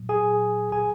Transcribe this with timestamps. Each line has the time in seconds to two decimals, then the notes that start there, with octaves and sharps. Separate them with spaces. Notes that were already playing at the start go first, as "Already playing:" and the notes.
Already playing: A#2 F#3
0.09 G#4 G#5
0.72 G#4 G#5